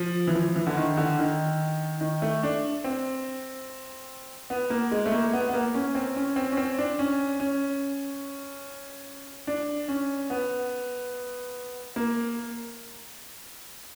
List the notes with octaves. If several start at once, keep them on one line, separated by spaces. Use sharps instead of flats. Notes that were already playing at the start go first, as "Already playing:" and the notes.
Already playing: F3
E3
F3
E3
D3
D#3
D3
D#3
D#3
A3
D4
C4
B3
A#3
G#3
A3
A#3
B3
B3
A#3
C#4
C4
C#4
C4
C#4
C4
D4
C#4
C#4
D4
C#4
B3
A#3